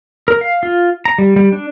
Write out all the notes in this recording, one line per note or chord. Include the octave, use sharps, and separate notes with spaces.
A#4
F5
F4
A#5
G3
G3
D4